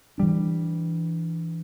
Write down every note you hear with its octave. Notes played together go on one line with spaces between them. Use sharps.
E3 G3 D4